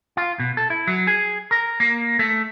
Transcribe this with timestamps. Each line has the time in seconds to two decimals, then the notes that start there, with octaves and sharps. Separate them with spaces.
0.17 F4
0.39 B2
0.57 A4
0.70 E4
0.87 F#3
1.07 G#4
1.51 A#4
1.80 A#3
2.19 A3